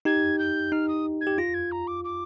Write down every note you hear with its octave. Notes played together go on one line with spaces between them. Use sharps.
D#4 G4 G#6
G6
D#4 F6
D#6
G#6
G4
F4 A#6
G#6
A#5
D6
D6